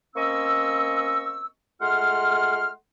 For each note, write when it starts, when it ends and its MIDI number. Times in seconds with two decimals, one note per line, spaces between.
0.16 1.47 58
0.16 1.47 60
0.16 1.47 61
0.16 1.47 75
0.16 1.47 85
0.16 1.47 88
1.81 2.70 56
1.81 2.70 57
1.81 2.70 65
1.81 2.70 78
1.81 2.70 84
1.81 2.70 89